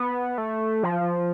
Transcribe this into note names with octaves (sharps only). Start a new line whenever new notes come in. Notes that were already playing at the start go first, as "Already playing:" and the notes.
Already playing: B3
A3
F3